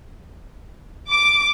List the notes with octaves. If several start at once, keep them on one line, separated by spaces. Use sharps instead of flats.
D6